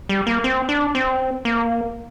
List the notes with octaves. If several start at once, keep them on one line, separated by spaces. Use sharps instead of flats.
G3
A#3
C4
D4
C4
A#3